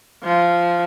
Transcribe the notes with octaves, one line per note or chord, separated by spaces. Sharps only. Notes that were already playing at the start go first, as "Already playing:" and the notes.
F3